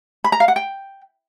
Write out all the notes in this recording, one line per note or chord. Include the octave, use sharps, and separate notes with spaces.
B5
A#5
F5
F#5
G5